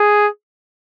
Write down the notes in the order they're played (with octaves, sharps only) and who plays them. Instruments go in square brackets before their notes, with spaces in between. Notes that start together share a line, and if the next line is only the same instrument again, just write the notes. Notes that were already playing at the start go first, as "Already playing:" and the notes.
Already playing: [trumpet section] G#4